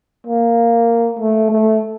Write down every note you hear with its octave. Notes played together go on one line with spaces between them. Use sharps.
A#3
A3
A3